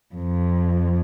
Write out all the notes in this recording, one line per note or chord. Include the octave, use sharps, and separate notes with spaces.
F2